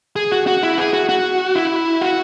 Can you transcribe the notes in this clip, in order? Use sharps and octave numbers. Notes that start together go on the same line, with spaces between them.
G#4
F#4
F#4
E4
G#4
F#4
F#4
E4
F#4